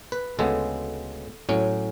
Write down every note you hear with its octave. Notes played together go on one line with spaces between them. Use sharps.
B4
D2 C#3 G#3 B3 A4
A2 F#3 C#4